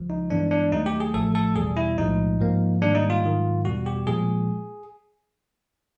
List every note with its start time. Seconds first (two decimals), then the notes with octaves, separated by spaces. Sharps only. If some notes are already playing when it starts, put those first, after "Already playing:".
Already playing: C#2 C#3 F3 G#3
0.10 D#4
0.30 G2 E3 G#3 B3 D4
0.51 D4
0.72 D#2 D#3 F#3 A3 D#4
0.86 G4
1.00 G#4
1.14 A1 A2 F3 A3 A4
1.35 A4
1.56 E2 B2 G3 G#4
1.77 E4
1.98 B1 A2 F3 G#3 D#4
2.40 G#2 F3 A#3
2.81 G#2 D#3 G3 A#3 D4
2.95 D#4
3.10 F4
3.24 G#2 D#3 F#3
3.65 E2 B2 G3 F#4
3.86 G4
4.07 A#2 F3 G#3 G#4